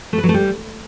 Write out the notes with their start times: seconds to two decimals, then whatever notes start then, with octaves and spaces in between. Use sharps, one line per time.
0.13 A3
0.18 B4
0.23 F#3
0.29 A3
0.34 G3